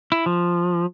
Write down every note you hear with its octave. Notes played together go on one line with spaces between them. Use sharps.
E4
F3